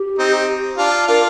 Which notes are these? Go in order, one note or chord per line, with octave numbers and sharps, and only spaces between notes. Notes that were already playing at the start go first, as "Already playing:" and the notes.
Already playing: G4
C4 D#4
D4 F4
D4 F4 A#4